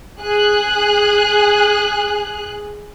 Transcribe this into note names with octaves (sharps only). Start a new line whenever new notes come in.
G#4 F#6